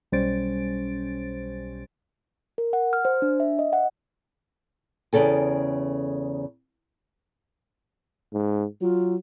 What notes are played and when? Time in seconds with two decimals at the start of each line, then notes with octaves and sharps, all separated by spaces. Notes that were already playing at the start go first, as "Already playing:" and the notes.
0.12 B1 G3 C#4 C5 A6 D7
2.58 A#4
2.73 F#5
2.93 F6
3.05 C5
3.22 D4
3.40 E5
3.59 D#5
3.73 F#5
5.13 E2 C#3 A4 G5
8.32 G#2
8.81 F#3 F4